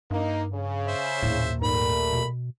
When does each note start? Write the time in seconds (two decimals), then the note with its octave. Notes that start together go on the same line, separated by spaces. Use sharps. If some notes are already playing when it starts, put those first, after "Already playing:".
0.11 G2 A#3 D#4
0.53 C#3
0.87 C5 E5
1.23 A#1 D#2 A2
1.62 G#2 G3 A3 A#4 B5
2.12 B2